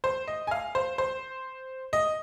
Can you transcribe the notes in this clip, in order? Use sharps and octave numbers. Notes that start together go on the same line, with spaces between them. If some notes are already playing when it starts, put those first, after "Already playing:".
C5
D#5
G#5
F5
C5
C5
D#5